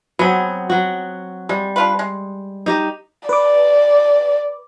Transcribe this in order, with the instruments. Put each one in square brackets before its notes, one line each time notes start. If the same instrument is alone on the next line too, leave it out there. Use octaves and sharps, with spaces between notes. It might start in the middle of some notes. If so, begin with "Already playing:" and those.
[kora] F#3 C4 [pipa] B3 G#4
[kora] F#3 F#4
[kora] G3 [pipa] G#3
[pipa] D4 F4 B4
G#3
[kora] D#4 G4 D#5
[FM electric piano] B4 D6 [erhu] D5